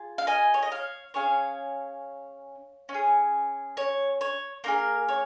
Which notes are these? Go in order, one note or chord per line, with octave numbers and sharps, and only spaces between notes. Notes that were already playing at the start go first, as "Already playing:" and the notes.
Already playing: F4 G#4
F5
D#5 G#5
C#5
D#5
C#5 F5
C#4 G#4 C#5 F5
C#4
G#4
C#5
C#5
A#3 D#4 G#4 A#4
C#5